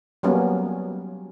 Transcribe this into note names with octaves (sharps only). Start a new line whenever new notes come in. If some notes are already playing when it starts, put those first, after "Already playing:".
F#3 G3 A#3 B3 C#4